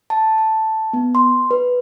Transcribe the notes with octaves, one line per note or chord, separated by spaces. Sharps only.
A5
A5
B3
C6
B4